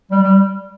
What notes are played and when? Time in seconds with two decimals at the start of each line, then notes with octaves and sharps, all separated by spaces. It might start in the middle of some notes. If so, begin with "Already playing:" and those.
0.11 G3
0.22 G3